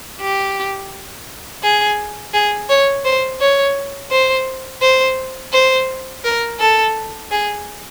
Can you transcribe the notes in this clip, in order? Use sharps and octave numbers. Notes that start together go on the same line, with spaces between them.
G4
G#4
G#4
C#5
C5
C#5
C5
C5
C5
A#4
A4
G#4